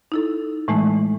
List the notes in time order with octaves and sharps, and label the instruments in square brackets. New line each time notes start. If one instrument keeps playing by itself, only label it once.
[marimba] D#4 E4 A4
A2 E3 G#3 A3